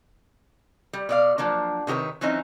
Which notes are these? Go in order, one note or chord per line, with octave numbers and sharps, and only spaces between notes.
G3
B2 D5 F5
F3 F#3 A#3 D4
C3 D#3 G4 B4 C#5
E3 F#3 C4 C#4 D#4